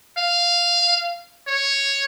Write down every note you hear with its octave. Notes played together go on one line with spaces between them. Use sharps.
F5
C#5